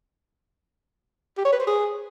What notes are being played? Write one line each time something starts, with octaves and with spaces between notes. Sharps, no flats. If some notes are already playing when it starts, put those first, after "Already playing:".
G4
C#5
B4
C5
G#4